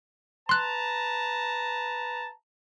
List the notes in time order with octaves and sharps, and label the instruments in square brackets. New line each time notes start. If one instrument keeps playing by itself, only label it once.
[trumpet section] B4 A5 A#5 [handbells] C6 F#6